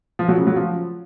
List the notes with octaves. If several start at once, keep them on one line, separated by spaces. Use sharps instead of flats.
F3
F#3
C#3
F#3
F3